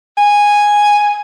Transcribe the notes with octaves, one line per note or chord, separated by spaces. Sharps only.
G#5